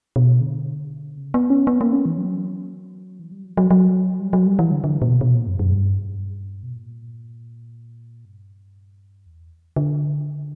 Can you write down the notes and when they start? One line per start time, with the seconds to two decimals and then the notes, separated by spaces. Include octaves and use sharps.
0.16 B2
0.41 D3
1.18 C#3
1.34 B3
1.50 C#4
1.67 B3
1.81 A#3
1.93 C#4
2.06 E3
2.18 F#3
3.19 E3
3.32 G3
3.44 F#3
3.57 F#3
3.71 F#3
4.20 G3
4.33 F#3
4.46 G3
4.59 E3
4.72 D3
4.84 D3
5.02 A#2
5.08 B2
5.21 B2
5.35 A#2
5.47 F#2
5.59 F#2
5.72 G2
6.63 B2
6.73 A#2
8.25 G2
9.26 E2
9.76 D3